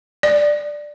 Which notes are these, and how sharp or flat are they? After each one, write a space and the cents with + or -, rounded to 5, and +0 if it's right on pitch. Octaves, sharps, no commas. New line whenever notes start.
D5 +5